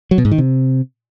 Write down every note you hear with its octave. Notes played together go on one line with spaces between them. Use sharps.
F#3
B2
G#2
D#3
C3